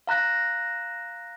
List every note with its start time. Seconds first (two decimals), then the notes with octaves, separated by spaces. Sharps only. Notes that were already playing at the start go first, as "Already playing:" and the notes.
0.07 F5 A#5 F#6 A#6